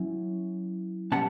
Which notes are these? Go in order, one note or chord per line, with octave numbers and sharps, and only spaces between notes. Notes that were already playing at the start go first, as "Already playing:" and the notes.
Already playing: F#3 C#4 E4
B2 G3 C#4 F#5 A5